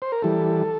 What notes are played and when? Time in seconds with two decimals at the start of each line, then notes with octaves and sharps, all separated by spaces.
0.02 C5
0.12 A#4
0.22 E3 G3 A4